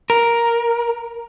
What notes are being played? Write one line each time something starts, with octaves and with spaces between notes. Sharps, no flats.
A#4